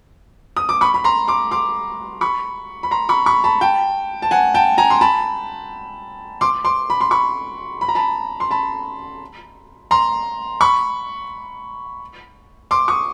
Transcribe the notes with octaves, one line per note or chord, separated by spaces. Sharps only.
D#6
D6
B5 C#6
B5
A#5 C6
C6 D6
C6 D6
B5 C#6
B5
A#5 C6
B5 C#6
B5 C#6
A5 B5
G5 A5
A5
F#5 G#5
G5 A5
G#5 A#5
C6
A5 B5
C6 D6
C6 D6
B5
C6
B5 C#6
B5
A#5
A5 B5
C6
A5 B5
A#5 C6
B5 C#6
C6 D6
C#6 D#6